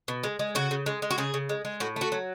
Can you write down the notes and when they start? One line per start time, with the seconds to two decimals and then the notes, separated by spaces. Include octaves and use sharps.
0.08 B2
0.24 G#3
0.39 G#3
0.55 C#3 F#4
0.71 C#3
0.86 G#3
1.02 G#3
1.11 F#4
1.18 C#3 G#4
1.34 C#3
1.49 G#3
1.65 G#3
1.80 A2 F#4
1.96 A3 F#4
2.12 F#3